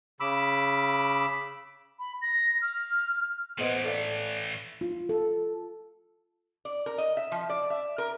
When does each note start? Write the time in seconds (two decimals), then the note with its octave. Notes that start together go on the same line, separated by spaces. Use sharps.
0.20 C#3 B5 D6 E6
1.99 B5
2.22 A#6
2.62 F6
3.58 A2 E3 B3 C5 D#5
3.84 A4 D5 F5
4.81 F4
5.09 A4
6.65 D5
6.86 A#4
6.98 D#5
7.17 E5
7.32 F3
7.50 D5
7.70 E5
7.98 A#4